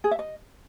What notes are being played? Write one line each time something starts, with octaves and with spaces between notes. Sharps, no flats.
G#4
E5
D#5